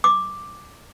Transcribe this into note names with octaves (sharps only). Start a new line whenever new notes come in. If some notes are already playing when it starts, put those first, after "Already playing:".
D6